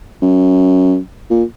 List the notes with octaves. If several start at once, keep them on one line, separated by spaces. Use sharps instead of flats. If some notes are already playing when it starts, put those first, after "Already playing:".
F#2
A#2